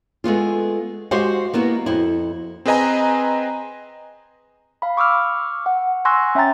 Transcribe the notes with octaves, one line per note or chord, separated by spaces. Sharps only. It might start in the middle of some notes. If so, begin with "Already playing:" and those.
G#3 A3 B3 F4
G#3 F#4 G4 C5 F5 F#5
A#3 B3 E4 F#4
F2 E4
C4 G#4 B4 D#5 G#5 A#5
F5 B5
C#6 D6 E6 F6
F#5
G#5 C6 C#6 E6 F#6 A#6
C#4 E5 G5 G#5 A#5 A6